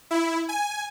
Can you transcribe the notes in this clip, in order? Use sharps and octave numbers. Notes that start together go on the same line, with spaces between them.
E4
G#5